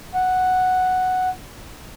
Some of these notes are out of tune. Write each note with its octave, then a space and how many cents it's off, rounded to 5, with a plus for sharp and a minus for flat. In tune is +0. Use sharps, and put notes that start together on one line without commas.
F#5 +0